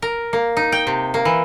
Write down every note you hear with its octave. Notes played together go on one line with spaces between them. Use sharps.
A#4
A#3
D#4
G5
C3
A#3
E3